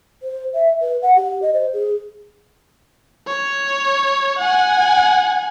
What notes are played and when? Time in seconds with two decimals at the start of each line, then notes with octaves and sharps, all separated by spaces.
0.23 C5
0.55 E5
0.81 B4
1.02 F#5
1.16 G4
1.42 D#5
1.54 C5
1.73 G#4
3.27 C#5
4.39 F#5 G#5